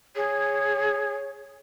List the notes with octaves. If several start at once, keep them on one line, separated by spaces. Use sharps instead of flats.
G#4 C#5